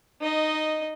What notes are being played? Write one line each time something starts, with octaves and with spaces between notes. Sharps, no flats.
D#4 D#5